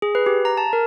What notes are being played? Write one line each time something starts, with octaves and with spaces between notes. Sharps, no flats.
G#4
B4
G4
A#5
A5
A#4